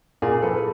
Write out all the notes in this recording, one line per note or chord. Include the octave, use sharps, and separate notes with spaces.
A#2 G#4 A#4
F3 A4 B4